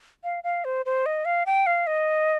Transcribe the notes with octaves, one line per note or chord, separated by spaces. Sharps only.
F5
F5
C5
C5
D#5
F5
G5
F5
D#5